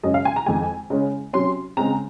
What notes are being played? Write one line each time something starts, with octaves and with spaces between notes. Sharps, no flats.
F#2 C#3 G#3 C#4 D#5
F5
G#5
A#5
F2 D#3 G#3 G#5
C#3 G#3 C#4
C3 F#3 C#4 C6
C#3 G#3 C4 A#5